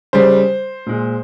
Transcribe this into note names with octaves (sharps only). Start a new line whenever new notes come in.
C#3 G3 C5
A#2 G#3